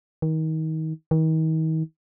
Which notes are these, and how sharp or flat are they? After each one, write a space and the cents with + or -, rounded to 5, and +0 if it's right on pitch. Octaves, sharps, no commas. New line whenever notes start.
D#3 +30
D#3 +40